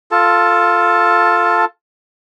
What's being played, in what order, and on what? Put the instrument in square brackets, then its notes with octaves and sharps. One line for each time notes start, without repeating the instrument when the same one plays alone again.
[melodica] F4 A4 A5